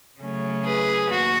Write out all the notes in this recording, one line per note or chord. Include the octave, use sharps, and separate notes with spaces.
C#3 F#3 A3 C#4
G#4 B4
D#2 F#4